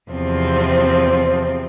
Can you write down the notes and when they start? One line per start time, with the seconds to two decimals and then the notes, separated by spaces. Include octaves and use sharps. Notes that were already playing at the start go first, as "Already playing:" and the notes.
0.11 E2 C3 F3 C4